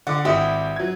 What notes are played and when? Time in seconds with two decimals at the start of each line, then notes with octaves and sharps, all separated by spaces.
0.07 D3 F#5 D6
0.25 G#1 E4 G4 F#5 D#6
0.76 F#3 G#6